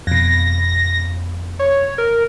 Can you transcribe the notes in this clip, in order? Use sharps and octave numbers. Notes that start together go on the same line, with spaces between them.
F2 B2 A#6
C#5
A#4